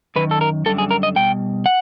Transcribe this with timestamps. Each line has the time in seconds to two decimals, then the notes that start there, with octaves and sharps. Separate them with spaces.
0.16 F#2 D#3 B4
0.31 A4
0.41 A#4
0.66 F#2 D3 G3 A4
0.78 G#4
0.91 A#4
1.03 D#5
1.16 B2 G3 G5
1.66 F#5